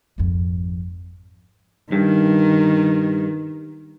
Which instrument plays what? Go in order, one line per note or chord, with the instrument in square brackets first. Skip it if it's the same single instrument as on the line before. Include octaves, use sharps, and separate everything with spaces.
[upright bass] G#1 F2
[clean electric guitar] G2 [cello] D#3